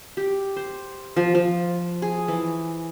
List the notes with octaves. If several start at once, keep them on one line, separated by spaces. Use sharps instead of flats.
G4
C5
F3
F3
G#4
E3